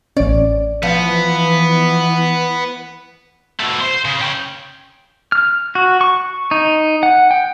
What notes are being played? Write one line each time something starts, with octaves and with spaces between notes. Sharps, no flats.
A1 C#4 D5
E3 F3 B3
B2 A3
C5
C#3
C#4 G5
F6
F#4
C#6
D#4
F#5
G5